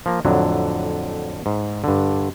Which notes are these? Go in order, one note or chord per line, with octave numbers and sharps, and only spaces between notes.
F3 A#3
F2 A2 D3 F#3
G#2
G2 D3